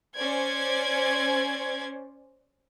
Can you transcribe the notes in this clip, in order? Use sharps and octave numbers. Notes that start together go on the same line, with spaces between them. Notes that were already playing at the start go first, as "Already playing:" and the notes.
C#4 C5 D5 G#6